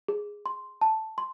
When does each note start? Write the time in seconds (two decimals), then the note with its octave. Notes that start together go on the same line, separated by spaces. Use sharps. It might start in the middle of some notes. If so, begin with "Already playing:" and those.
0.08 G#4
0.46 C6
0.81 A5
1.18 C6